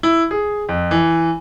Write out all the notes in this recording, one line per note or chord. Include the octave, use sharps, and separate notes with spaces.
E4
G#4
F2
E3